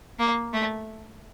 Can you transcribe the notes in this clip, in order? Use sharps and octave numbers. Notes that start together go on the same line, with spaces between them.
A#3
A3